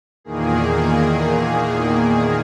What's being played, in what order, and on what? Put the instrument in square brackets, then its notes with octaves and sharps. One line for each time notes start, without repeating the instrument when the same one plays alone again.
[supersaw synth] E2 A#2 D#3 A#3 G#4